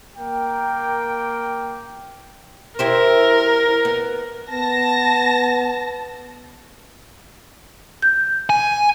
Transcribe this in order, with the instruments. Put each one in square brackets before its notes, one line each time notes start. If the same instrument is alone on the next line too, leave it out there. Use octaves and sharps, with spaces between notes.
[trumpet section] A#3 A#4 G5
[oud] E4 G4 C5 [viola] A#4
[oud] B3
[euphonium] B3 [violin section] A5 A#6
[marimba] G6
[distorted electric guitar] G#5